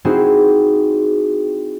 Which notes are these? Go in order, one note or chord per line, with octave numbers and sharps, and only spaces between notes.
C4 D#4 E4 F#4 G#4 C5